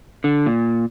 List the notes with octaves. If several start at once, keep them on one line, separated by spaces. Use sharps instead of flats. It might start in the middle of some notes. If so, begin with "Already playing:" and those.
D3
A#2